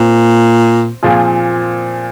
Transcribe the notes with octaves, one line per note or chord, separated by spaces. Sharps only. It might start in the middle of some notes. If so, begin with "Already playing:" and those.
Already playing: A#2 C4
A#2 F3 C4 F4 G#4